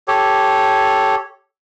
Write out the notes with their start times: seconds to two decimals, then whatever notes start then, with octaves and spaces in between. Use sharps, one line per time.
0.08 G4 A4 C#5